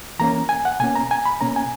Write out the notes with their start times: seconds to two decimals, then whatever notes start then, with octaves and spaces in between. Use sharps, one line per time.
0.19 E3 A#3 C#4 A#5
0.49 G#5
0.65 F#5
0.80 B2 A#3 C#4 G#5
0.95 A#5
1.11 G#5
1.25 B5
1.41 B2 A#3 C#4 A#5
1.56 G#5